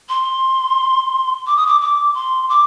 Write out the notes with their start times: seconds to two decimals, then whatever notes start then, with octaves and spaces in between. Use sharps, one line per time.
0.09 C6
1.47 D6
1.57 D#6
1.67 D6
1.81 D6
2.15 C6
2.50 D6